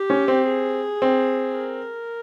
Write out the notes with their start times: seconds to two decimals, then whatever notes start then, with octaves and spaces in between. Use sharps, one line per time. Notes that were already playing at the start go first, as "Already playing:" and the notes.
Already playing: G4
0.10 C#4
0.28 C4
0.47 G#4
1.02 C4
1.57 A#4